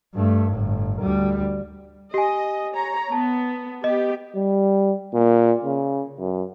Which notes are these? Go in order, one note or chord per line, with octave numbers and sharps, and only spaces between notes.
G2 A3
G1 A2
D2 G3
G4 D#5 G#5
C#5 A#5
B3 A5
B3 G4 D#5
G3
A#2
C#3
F#2